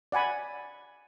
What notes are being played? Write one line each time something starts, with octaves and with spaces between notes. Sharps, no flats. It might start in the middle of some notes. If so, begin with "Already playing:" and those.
D5 F#5 G#5 B5